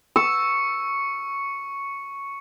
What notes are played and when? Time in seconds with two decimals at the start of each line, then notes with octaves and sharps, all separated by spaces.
0.16 C#6 E6 C#7